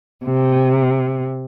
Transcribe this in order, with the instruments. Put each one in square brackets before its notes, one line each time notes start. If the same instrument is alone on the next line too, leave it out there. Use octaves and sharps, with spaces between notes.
[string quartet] C3